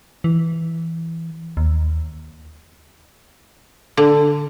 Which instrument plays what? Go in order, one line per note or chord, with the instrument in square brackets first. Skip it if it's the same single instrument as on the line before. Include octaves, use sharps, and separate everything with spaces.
[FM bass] E3
D#2
[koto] D3